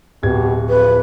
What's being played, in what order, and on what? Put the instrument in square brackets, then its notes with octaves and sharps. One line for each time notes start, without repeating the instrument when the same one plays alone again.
[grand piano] D1 G#6 [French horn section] B2 G4
[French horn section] F2 [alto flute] B4